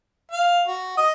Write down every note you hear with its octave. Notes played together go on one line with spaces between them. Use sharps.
F5
F#4
D#5